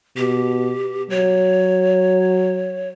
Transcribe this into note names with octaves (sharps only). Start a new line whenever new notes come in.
B2 G4
F#3 C#5